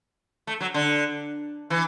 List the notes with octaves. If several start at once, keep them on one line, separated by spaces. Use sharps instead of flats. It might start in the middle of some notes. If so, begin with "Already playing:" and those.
A3
F#3
D3
E3